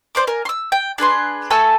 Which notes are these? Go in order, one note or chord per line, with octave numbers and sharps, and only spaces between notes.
C5 D5 D6
A#4 G#5
C6 E6
G5
D4 G#4 B4 C6
A3 A4 G#5 E6